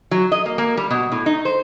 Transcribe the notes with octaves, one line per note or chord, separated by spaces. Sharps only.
F#3
D#5
A#3
A#3
G3
B2
A2
D#4
C5